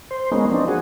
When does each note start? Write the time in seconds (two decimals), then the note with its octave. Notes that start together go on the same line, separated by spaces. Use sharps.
0.11 C5
0.32 G#3 A#3 B3 C#4 D#4
0.52 F3 C4 D4 D#4
0.68 F#4 G#4